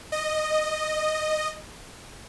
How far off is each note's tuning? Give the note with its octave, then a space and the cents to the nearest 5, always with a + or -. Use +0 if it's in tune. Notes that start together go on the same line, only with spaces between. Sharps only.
D#5 -10